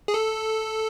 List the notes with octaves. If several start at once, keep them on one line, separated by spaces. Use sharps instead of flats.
G#4
A4